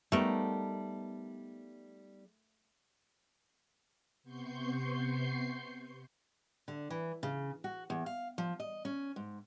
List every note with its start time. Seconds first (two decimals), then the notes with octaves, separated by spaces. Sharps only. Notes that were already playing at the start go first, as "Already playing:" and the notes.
0.12 G3 A3 B3 D#4 A#4
4.23 C3 B3 C6 C#6 G6 C7
6.68 D3
6.90 E3
7.23 C#3
7.64 F#4
7.90 E2
8.06 F5
8.38 F3
8.60 D#5
8.85 C#4
9.16 G#2